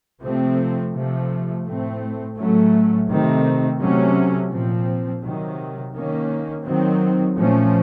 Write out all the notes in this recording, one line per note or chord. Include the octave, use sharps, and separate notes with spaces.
C3 F3 A3 C4
C3 F3 A3
A2 A3 C4
A2 F#3 A3 C#4
C3 D#3 A3 C4
C3 F#3 A3 C#4
A#2 F3 C4
C3 D#3 F#3
D#3 A#3 C#4
D#3 F#3 C4
A#2 F3 A3 C#4